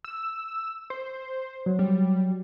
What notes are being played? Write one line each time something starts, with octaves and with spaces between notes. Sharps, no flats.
E6
C5
F#3
G3